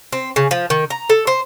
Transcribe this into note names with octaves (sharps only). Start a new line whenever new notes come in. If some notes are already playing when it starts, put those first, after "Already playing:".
C4
C#3
F3
D#3
A#5
A4
C5